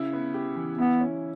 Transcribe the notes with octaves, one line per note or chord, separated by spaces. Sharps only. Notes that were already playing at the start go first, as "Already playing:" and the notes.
Already playing: C#3 E4
B3
G4
E3
B3 E4
C#4